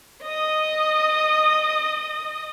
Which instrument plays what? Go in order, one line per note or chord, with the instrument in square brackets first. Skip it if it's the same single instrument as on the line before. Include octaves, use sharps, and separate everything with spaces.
[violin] D#5 D#6